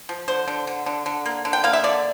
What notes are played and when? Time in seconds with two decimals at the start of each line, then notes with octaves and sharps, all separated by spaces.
0.09 F3
0.28 D3 C5
0.48 D3
0.67 D3
0.86 D3
1.06 D3
1.26 A#3
1.45 D3
1.53 G5
1.64 A#3 F5
1.73 E5
1.84 D3 D5